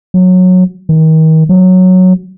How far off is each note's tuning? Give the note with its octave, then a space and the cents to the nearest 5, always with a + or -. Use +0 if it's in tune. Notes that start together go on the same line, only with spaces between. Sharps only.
F#3 -15
D#3 +35
F#3 -5